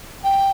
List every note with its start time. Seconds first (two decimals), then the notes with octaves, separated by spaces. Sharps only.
0.24 G5